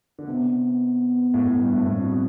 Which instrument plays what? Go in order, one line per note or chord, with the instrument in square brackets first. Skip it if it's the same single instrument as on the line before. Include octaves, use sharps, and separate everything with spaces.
[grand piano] D3
[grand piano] C3 [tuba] B3
[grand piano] A2
A2
G2
A2
[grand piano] A2 [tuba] C4
[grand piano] B2